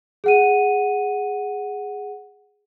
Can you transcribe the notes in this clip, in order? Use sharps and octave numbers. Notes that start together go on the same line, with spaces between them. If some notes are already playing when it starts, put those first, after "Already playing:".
G#4 F#5 D#7